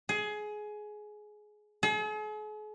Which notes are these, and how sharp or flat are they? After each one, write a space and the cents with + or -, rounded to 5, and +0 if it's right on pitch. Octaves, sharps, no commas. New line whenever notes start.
G#4 +20
G#4 +45